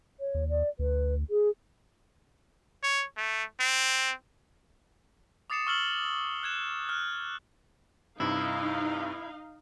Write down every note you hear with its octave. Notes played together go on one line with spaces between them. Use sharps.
C#5
D#2
D5
D2 B4
G#4
C#5
A3
C4
D6 D#6 A6 C7 C#7 E7
C#6 E6 F6 A6 F#7 G7
F#6 G#6 E7
F6 F#6
G2 C3 D#4 E4 F5